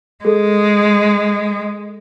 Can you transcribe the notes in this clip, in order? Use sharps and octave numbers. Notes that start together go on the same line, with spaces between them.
G#3 G#4 A4